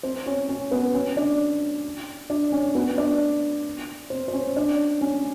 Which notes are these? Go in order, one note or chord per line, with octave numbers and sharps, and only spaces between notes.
C4 C5
C#4 C#5
C#4 C#5
B3 B4
C#4 C#5
D4 D5
D4 D5
C#4 C#5
B3 B4
D4 D5
C4 C5
C5
C#4 C#5
D4 D5
C#4 C#5